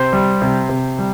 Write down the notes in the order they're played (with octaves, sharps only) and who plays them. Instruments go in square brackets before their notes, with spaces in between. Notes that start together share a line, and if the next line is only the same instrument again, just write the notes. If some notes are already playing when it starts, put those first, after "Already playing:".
Already playing: [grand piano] C3 C5
G3
C3
C3
G3